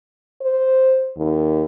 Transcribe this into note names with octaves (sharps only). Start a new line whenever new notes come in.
C5
D#2